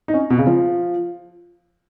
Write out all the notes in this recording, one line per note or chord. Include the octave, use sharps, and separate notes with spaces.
D#4
C#4
B2
C#3
F3